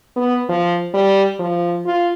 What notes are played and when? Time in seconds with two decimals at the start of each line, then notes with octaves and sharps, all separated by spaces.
0.16 B3
0.49 F3
0.94 G3
1.39 F3
1.85 F4